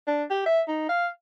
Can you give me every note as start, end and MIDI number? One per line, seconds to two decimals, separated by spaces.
0.07 0.24 62
0.30 0.44 67
0.46 0.61 76
0.68 0.85 63
0.89 1.07 77